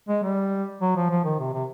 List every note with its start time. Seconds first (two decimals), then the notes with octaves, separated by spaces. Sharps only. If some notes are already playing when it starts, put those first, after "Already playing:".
0.09 G#3
0.23 G3
0.81 F#3
0.96 F3
1.10 F3
1.24 D#3
1.40 C3
1.54 C3